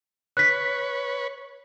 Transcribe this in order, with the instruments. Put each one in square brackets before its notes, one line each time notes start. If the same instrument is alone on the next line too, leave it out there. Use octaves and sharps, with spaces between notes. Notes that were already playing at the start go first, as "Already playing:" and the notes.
[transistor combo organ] B4 C#5 [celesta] F#6 B6